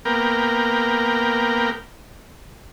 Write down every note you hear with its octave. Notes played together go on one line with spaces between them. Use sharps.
A#3 B3 A#4 G5